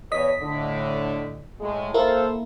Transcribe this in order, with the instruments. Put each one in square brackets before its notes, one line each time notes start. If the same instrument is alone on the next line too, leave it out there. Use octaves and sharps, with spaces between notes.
[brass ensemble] E2 C#5 [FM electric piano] D#5 B6
[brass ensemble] A2 D3
A2 G#3
[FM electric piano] A#3 E4 [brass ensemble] A4 C5 F5